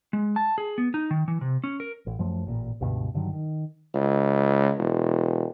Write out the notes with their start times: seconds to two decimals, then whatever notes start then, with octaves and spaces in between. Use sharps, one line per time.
0.13 G#3
0.36 A5
0.58 G#4
0.78 B3
0.94 D#4
1.11 D#3
1.28 E3
1.41 C3
1.64 C#4
1.80 A#4
2.07 A1
2.19 F#2 F3 A3
2.47 A1 A#2
2.80 C#2 G2 B2 D3
3.14 G2 D3 D#3 F#3
3.33 D#3
3.94 C#2
4.78 E1